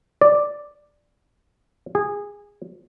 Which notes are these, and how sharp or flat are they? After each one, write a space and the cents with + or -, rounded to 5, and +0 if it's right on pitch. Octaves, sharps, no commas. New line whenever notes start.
D5 +5
G#4 -20